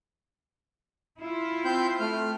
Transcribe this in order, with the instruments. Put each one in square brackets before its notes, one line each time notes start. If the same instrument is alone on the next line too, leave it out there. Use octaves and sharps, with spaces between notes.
[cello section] E4 F4
[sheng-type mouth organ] C4 C6 G6
A3 F6